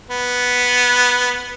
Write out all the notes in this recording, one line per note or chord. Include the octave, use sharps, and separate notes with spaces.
B3